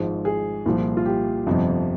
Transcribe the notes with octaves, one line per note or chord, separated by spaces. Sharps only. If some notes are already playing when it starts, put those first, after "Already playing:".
Already playing: G#1 G#2 F3
G#4
C2 A#2 F3
F4
G4
G1 F2 C3 F3